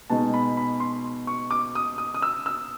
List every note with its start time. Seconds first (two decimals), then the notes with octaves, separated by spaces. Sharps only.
0.10 B2 G#3 B3 D#4 A5
0.34 B5
0.57 B5
0.80 C6
1.27 C#6
1.51 D6
1.75 D#6
1.98 D#6
2.14 D#6
2.22 E6
2.46 E6